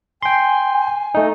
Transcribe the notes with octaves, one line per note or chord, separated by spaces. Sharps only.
G5 G#5 C6
A3 D#4